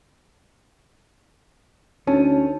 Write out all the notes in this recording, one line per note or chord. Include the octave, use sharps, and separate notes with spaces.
D2 C#4 D#4 C#5 A5